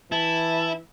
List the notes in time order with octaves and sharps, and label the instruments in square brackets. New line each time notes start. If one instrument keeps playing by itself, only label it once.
[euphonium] E3 [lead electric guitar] E4 [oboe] A5